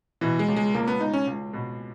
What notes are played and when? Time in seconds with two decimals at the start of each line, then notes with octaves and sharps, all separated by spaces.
0.21 B2 E3
0.39 G#3
0.48 C#2
0.56 G#3
0.74 C#2 A#3
0.88 B3
1.00 C#2 D#4
1.13 C#4
1.27 C#2
1.53 B2